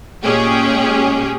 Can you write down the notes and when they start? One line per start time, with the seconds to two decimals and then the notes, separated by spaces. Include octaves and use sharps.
0.23 A#2 G#3 C#4 G4 G#4